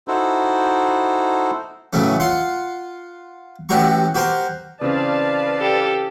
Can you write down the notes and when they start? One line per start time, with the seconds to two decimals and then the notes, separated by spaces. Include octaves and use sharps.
0.08 D#4 E4 F#4 A4 C5
1.93 A1 C#3 F#3 A3 C#4
2.20 F4 F#5 C6
3.69 A1 A2 F#4 G4 A#5 C#6
4.15 F#4 G4 A#4 C5
4.81 C#3 E3 C4 B4 D5 F5 A5
5.60 G4 A4